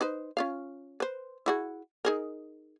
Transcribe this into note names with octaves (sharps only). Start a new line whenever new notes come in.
D#4 B4 C5
C#4 F4 F5
B4 C5
E4 F#4 G#4
D#4 G#4 A#4